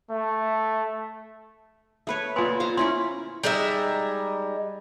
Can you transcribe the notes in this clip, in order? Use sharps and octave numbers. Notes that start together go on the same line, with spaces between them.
A3
A3 B4 C#5
A#2 B3 G#5 C6
C5 F5 A#5
C#4 E4 A#4 C6
G3 G#3 D#4 E5